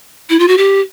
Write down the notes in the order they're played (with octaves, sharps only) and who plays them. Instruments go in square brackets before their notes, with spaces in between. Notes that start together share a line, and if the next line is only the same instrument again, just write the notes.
[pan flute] E4
F4
F#4
G4